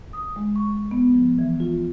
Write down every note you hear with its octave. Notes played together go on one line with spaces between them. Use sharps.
D#6
G#3
C#6
B3
F3
E3
F4